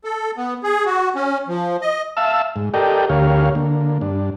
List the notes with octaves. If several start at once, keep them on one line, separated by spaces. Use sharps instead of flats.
A4
B3
G#4
F#4
C#4
F3
D#5
E5 F5 A5 E6
G#2
G4 A4 A#4 D5 D#5 G5
D2 G4 A#4 C#5 F5
D3 A#3
G2 D4